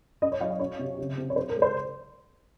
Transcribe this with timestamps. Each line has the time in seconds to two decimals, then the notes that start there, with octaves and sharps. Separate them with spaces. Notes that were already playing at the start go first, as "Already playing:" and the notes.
0.22 C#4 D#5
0.32 C#5
0.40 F#3 F5
0.50 F5
0.60 C#4 C#5
0.79 C3
0.99 C#3
1.17 C4
1.30 C#5
1.36 C4 C5
1.49 A#4
1.56 G#3
1.62 C5